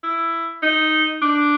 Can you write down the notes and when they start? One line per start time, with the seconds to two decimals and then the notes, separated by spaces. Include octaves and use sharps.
0.04 E4
0.63 D#4
1.22 D4